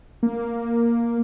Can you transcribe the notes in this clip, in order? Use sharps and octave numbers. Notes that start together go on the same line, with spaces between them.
A#3